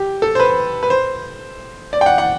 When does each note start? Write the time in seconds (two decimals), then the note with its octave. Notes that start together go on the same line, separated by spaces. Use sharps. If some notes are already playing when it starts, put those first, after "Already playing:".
Already playing: G4
0.22 A4
0.35 C5
0.40 B4
0.83 B4
0.90 C5
1.93 D5
2.01 G5
2.06 F#5
2.18 F#5